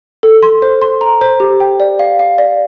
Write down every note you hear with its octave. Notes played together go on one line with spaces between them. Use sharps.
A4
C6
C5
C6
A#5
C5
G4
G5
D5
F5
F5
D5